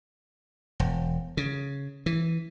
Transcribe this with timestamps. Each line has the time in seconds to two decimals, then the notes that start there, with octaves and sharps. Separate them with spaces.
0.80 E1
1.37 C#3
2.06 E3